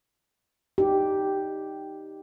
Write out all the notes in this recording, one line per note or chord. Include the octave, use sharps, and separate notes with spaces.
D#4 G4